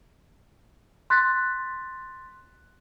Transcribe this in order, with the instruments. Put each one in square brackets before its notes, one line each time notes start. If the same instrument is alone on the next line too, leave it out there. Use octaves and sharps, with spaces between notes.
[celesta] C6 F#6 A6 B6